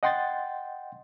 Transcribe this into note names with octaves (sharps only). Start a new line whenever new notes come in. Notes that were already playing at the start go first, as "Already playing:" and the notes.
D#5 F#5 G5 C6 G6 A6